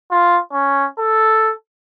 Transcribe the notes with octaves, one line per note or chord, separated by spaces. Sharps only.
F4
C#4
A4